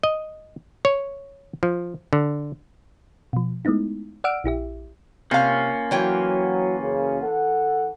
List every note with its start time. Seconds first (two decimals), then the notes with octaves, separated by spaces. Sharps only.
0.03 D#5
0.85 C#5
1.63 F3
2.13 D3
3.33 B2 F3
3.65 G#3 A3 B3 D#4 E4
4.24 D5 F#5 E6 F6 D7
4.44 A#1 E4 G4 E5
5.31 C3 A#3 C#4 F4 F5
5.91 E3 F#3 C#5 G5
6.79 F#2 C#3
7.22 A4 F#5